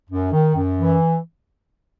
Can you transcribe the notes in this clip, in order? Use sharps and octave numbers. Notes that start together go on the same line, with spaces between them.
F#2
D#3
F#2
E3